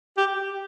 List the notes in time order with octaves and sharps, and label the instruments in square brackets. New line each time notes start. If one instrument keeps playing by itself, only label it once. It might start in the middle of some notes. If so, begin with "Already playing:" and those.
[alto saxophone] G4